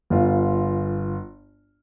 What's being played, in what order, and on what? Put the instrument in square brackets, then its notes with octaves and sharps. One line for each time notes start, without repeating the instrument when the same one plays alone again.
[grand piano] G1 F4